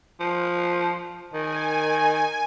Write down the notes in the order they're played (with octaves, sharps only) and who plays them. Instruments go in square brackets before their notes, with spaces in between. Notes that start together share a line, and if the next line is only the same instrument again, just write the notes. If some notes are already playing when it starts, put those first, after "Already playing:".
[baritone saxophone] F3
[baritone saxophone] D#3 [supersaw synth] G#5